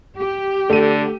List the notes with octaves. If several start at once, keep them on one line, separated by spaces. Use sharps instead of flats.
G4
D3 A3 D#7